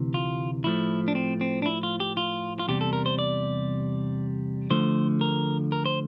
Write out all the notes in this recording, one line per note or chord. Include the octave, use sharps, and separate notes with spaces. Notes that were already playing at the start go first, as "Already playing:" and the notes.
Already playing: D2 C3 E3
F4
A2 F3 A3 E4
D4
C4
C4
D4
E4
F4
G4
F4
F4
E2 C3 G3 G4
A4
A#4
C5
D5
D2 D3 F3 A3 C5
A#4
A#4
C5